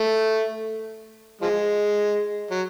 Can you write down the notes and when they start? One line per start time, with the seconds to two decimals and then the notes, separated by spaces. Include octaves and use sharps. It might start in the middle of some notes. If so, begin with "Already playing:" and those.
Already playing: A3
1.41 F3 G#3
2.51 F#3